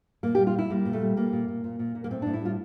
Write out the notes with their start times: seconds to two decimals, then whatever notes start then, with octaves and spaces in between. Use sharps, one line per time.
0.23 A#2 A#3
0.35 G3 G4
0.47 F4
0.55 G3 E4
0.70 G3 A#3
0.85 A#2
0.93 A3
1.01 G3
1.17 A#2 A#3
1.33 A#2
1.48 A#2
1.64 A#2
1.79 A#2
1.95 A#2
2.04 A#3
2.11 A2 C4
2.22 A2 D4
2.33 E4
2.42 G3 F4